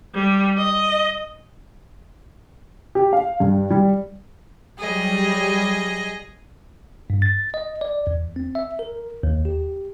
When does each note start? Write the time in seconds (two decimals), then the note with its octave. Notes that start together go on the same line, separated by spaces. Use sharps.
0.15 G3
0.58 D#5
2.95 G4
3.13 F5
3.40 G2
3.70 G3
4.79 F#3 G3 G#4 D#5
7.10 G2
7.22 A6
7.54 D#5
7.81 D5
8.07 E2
8.36 C4
8.55 E5
8.79 A#4
9.23 D#2
9.45 G4